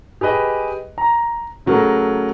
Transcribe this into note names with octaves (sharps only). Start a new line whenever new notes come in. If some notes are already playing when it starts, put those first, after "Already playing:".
G4 G#4 B4 D#5
A#5
C#3 F#3 A3 A#4